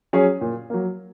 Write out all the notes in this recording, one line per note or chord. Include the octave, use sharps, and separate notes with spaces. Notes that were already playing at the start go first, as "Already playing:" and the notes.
F#3 C#4 G#4 C#5
A#2
F#3 A#3